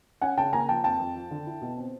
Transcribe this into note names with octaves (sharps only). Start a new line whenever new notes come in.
C#4 F#5 G#5
C#3 G5 A5
A#3 G#5 A#5
F3 G5 A5
F2 G5 A5
F2
F3
D3
E4
B2
C4